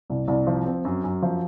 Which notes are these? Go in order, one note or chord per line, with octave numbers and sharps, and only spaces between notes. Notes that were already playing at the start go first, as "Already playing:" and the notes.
C2
C2
F3
C4
F#2
F#2
F3